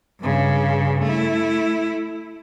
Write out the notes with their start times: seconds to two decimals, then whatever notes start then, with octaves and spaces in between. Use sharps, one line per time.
0.20 G2 C#3
1.03 A3 E4